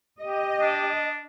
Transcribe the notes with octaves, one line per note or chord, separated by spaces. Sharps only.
G4 D#5
D4